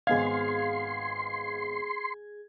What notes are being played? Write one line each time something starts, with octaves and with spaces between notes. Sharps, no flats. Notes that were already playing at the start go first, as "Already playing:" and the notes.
G#1 B3 G#4 D#5 F5 C6 G#6